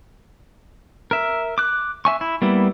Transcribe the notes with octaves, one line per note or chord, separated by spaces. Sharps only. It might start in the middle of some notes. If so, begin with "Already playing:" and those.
A#4 E5
D6 F#6
E5 G#5 C#6
E4
G3 A#3 B3 E4